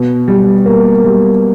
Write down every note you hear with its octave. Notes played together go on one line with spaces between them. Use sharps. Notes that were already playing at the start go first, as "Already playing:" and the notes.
Already playing: B2
G3
A#3
G3